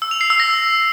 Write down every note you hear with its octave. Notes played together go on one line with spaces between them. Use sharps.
E6
F7
C7
E6
A#6